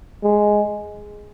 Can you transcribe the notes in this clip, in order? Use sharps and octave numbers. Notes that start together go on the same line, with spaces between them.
G#3